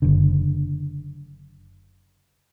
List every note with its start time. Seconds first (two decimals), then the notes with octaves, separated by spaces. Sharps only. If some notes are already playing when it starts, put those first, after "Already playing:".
0.02 F#1 D3